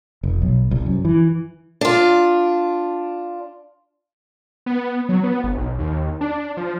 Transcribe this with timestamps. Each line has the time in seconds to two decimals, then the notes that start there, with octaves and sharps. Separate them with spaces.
0.23 F1
0.42 B1
0.71 C2
0.86 F#2
1.05 E3
1.81 D4 F4
4.66 B3
5.09 F#3
5.23 B3
5.44 G1
5.57 B1
5.79 D#2
6.21 D4
6.57 F3